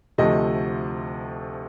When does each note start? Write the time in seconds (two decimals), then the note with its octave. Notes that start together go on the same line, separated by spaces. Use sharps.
0.18 D2 C3 F3 A3 D#5